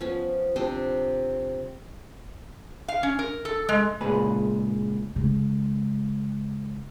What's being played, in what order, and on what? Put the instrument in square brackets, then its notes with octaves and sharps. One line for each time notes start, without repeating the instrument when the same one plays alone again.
[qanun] F3 B3 C#4
C3 D4 C5 D#5
[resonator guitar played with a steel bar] F5
C#4
A#4
A4
G#3
[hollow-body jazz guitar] C#2 A#2 G#4 B4
[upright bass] C#3 G#3